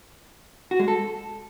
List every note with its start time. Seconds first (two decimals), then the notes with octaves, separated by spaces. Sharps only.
0.71 F#4
0.79 G#3
0.88 A4